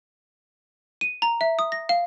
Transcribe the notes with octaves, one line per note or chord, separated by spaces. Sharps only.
D#7
A#5
E5
D#6
A#6
F5